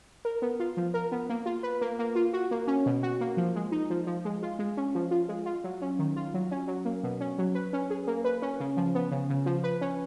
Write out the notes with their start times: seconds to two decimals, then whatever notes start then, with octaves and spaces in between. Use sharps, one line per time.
0.25 A#4
0.42 B3
0.60 F4
0.77 F3
0.94 A#4
1.12 B3
1.29 A#3
1.46 F4
1.63 B4
1.81 A#3
1.99 A#3
2.15 F4
2.33 F#4
2.51 A#3
2.67 C#4
2.86 B2
3.03 F#4
3.21 A#3
3.37 F3
3.56 G#3
3.72 D#4
3.90 F3
4.07 F3
4.25 G#3
4.43 F4
4.59 G#3
4.77 C#4
4.95 F3
5.11 F4
5.29 G#3
5.46 F4
5.64 F#3
5.81 C#4
5.99 D#3
6.16 F4
6.34 F#3
6.51 C#4
6.68 F#3
6.85 A#3
7.03 B2
7.20 C#4
7.38 F#3
7.55 B4
7.73 C#4
7.90 G#4
8.07 A#3
8.25 B4
8.42 C#4
8.60 C#3
8.77 F3
8.95 B3
9.11 C#3
9.30 C#3
9.46 F3
9.64 B4
9.81 C#4